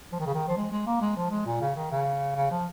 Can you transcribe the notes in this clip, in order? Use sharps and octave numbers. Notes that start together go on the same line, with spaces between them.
F3
D#3
C#3
D#3
F3
G#3
G#3
A#3
G#3
F3
G#3
A#2
C#3
D#3
C#3
C#3
F3